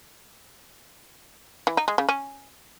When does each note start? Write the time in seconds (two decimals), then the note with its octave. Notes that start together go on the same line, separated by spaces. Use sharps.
1.67 E3
1.77 D#4
1.88 G#3
1.98 C#3
2.09 C#4